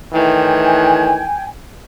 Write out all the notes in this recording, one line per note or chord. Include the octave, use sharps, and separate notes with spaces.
A2 D#3 E3 G5 G#5